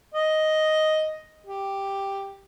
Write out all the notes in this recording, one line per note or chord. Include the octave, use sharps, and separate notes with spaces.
D#5
G4